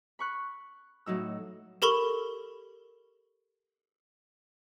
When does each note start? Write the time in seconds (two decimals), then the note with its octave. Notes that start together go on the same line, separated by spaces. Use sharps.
0.19 B5 C#6 F#6
1.06 A2 F#3 D#4 E6
1.82 G4 A4 A#4 B5 C#6 G7